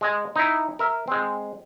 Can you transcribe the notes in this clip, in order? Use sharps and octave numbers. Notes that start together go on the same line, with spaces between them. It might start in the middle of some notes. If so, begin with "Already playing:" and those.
G#3 D#5 G#5
D#4 E4
A#4 E5
G#3 C4